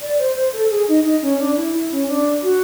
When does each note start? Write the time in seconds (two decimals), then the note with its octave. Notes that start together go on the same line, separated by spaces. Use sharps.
0.01 D5
0.19 C5
0.36 C5
0.53 A4
0.70 G#4
0.88 D#4
1.04 D#4
1.22 C#4
1.40 D4
1.56 E4
1.74 E4
1.92 C#4
2.08 D4
2.43 F#4